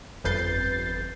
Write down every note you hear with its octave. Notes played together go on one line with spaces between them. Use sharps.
G1 F2 B4 G6 A6 C7